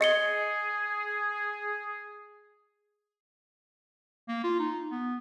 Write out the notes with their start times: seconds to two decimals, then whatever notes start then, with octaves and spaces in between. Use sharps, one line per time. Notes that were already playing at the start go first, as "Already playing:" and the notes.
0.01 G#4 D#5 C#7 G7
4.28 A#3
4.44 F4
4.59 D#4
4.91 B3